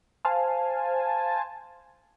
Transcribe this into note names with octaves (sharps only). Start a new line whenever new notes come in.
C5 F5 G#5 A5